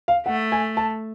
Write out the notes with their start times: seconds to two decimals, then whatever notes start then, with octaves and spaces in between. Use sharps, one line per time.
0.08 F5
0.26 A3 F#5
0.52 G#5
0.77 A5